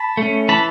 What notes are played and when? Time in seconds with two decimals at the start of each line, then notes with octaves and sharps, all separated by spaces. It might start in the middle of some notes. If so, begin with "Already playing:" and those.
Already playing: A5 B5
0.17 A3 C#4
0.48 E3 A5 B5